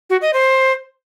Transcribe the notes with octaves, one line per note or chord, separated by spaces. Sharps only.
F#4
D#5
C5